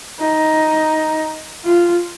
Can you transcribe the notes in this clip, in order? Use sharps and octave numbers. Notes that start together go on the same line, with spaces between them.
D#4
F4